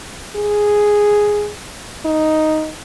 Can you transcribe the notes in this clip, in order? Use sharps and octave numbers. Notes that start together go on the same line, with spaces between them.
G#4
D#4